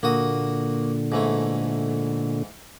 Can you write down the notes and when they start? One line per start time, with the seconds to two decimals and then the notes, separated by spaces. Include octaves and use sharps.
0.03 A#2 D3 A#3 F#4 D#6
1.12 G#2 E3 A3